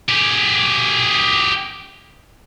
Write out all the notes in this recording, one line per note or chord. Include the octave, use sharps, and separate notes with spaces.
G4 G#4